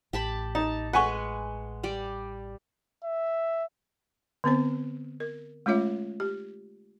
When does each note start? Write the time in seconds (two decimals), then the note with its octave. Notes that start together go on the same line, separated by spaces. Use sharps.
0.13 A1 G4 A5 B5
0.55 D#4 A5
0.93 G#3 B4 F#5 G#5 C#6
1.83 G3 G4 D5
3.04 E5
4.44 D3 B3 C4 C5
5.20 A#4
5.66 G#3 A3 C#4 F4 C#5 E5
6.20 G4